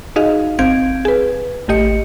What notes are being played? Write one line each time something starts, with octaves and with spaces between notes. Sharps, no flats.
D#4 F#4 G#4 D#5 F5
G#1 C4 F5 G6 G#6 D7
G#4 B4
A1 A3 G4 D#5 C#7